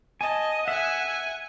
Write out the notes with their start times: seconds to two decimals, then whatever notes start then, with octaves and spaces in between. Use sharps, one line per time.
0.21 D#5 G#5 A5
0.68 E5 F#5 G#5